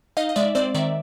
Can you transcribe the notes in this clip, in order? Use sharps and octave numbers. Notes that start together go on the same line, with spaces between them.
D#4 D#5 F5
D#5
G#3 D5 E5
C4 C5 D5
D#3 D5 E5